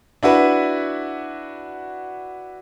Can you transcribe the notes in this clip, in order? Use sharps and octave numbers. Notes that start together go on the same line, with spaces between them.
D4 E4 F#4 B4